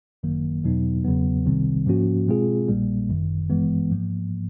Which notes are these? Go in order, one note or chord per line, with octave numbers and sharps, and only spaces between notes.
G#1 F#2 D#3 F#3 A#3
E2 B2 F#3 B3 D#4
E2 C#3 F#3 B3
C2 C3 D#3 G3 C4
G#2 F3 A#3 C#4 F#4
B2 G#3 C4 F4 G#4
A#1 A#2 G3 A#3
G1 F#2 D#3
G#1 G2 E3 G#3 B3
G#2 F3 A#3